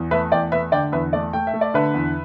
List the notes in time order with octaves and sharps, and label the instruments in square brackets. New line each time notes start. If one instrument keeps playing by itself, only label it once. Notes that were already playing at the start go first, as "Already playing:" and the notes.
Already playing: [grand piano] E2
A3 B4 E5
E2 D5 G5
A3 B4 E5
D3 D5 G5
E2 B4 E5
A3 D5
A3 G5
E5
A3
D5
D3 B4 E5
E2